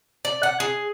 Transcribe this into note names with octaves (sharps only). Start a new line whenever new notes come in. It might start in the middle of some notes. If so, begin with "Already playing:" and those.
D5
F#5
G#4